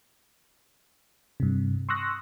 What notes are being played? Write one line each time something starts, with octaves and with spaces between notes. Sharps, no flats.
G2 C3
C6 C#6 D#6 E6 F#6 A#6